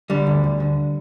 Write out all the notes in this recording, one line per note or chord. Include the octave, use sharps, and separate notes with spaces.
D3 G3
D2
D2
D3